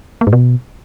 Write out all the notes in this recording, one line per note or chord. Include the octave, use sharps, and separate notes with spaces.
A#3
G#2
B2